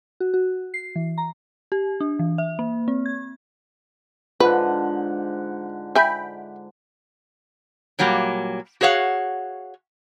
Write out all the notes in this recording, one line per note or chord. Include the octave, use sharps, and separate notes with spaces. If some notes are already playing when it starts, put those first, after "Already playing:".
F#4
F#4
C7
E3
A#5
G4
D4
E3
E5
A#3
C4
G#6
G#2 D3 F4 B4 F#5
E5 G5 G#5 B5
A#2 F#3 G3 A#3
F#4 G#4 C#5 F5 F#5